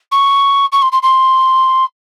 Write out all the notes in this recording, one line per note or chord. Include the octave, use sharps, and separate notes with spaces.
C#6
C#6
C6
C6
C6